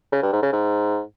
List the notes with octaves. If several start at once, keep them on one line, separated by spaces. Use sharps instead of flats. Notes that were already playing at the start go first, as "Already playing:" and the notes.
C#3
G2
G#2
C#3
G#2